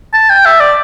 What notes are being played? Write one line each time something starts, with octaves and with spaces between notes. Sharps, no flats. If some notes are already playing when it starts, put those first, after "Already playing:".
A5
G5
E5
D5